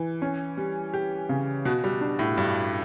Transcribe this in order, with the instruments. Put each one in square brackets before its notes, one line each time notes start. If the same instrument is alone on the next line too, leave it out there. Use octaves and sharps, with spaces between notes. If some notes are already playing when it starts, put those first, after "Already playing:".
Already playing: [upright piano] E3
C#4
G3
G4
C#3
[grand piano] B2 [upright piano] F#4
[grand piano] G3
[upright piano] D4
[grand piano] A2
[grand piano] G2 [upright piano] G3